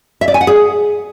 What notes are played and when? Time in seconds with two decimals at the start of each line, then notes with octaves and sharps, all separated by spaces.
0.21 E5
0.28 D5
0.34 G#5
0.41 F#5
0.47 G#4